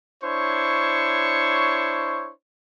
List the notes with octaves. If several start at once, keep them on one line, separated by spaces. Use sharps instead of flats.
D4 E4 C5 C#5 C#6